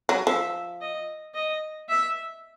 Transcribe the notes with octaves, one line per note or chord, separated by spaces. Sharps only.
F#3
F3 E5
D#5
D#5
E5